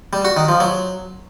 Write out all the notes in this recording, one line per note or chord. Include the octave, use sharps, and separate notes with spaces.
G3
F#4
D#3
F3
F#3